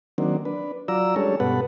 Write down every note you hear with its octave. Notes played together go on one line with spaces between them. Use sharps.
D#3 F#3 A#3 C4 D4
D4 B4
F#3 F4 D5 A#5 E6
G3 G#3 C#4 D4 A4 C#5
G2 B2 B3 A4 B4 F#5